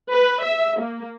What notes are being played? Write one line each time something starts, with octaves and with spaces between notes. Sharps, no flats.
B4
E5
A#3